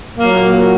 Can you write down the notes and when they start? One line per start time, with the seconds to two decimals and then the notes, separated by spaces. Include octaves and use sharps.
0.18 A#2 F#3 A#3